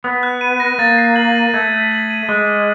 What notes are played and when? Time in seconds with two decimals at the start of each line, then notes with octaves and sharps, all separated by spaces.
0.04 B3 D#6
0.23 F#6
0.41 D#7
0.60 A#6
0.78 A#3 A6
0.98 C7
1.16 F#7
1.36 D#7
1.54 A3 G#6
1.72 B6
1.91 F#7
2.10 D#7
2.29 G#3 D6
2.48 F6